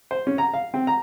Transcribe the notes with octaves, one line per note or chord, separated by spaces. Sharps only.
C5
C#4
A#5
F5
C4
A#5